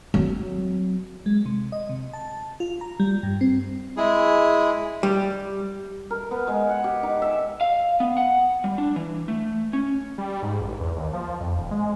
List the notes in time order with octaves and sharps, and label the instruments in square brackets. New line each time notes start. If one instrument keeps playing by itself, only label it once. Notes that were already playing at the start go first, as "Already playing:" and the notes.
[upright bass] F#3 C4
[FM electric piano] G#3
C3
D#5
C3
A5
F4
A#5
G3
G2
C4
[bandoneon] G#3 E4 G#4
[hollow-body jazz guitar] G3
[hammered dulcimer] A#4
B3
G#3
F#5
G4
D#4
E5
[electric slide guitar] F5
B3
F#5
G3
D4
E3
A3
C#4
[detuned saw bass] G3
G#2
A1
E2
D#2
F3
F2
D#1
G#3